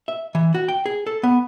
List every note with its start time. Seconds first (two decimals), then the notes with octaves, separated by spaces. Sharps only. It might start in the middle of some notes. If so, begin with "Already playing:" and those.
0.08 E5
0.35 E3
0.54 F#4
0.68 G5
0.86 G#4
1.07 A4
1.23 B3